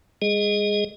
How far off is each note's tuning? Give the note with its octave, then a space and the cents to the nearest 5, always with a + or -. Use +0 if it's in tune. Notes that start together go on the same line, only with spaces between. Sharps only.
G#3 -40 G#4 +0 D#5 +0